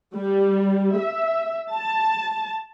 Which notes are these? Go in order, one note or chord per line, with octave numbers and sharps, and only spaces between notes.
G3
E5
A5